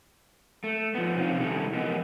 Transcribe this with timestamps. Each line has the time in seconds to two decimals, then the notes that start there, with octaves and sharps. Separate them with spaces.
0.64 A3
0.95 F3 B3
1.16 F2 C3 F3 C#4 D#4 F5
1.39 C3 D#3 G3 C#4 E4 A4
1.74 F2 E3 B3 A#4 D#5